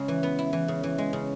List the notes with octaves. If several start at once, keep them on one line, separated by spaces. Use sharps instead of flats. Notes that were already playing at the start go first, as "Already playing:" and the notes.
Already playing: C#3 G#3
E3
B3
E4
E3
C#3
E3
G#3
C#3